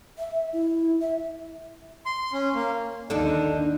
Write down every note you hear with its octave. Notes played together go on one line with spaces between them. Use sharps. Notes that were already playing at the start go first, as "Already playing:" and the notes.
E5
E4
E5
C6
C#4
A#3
D#2 D3 D4 D#4 A4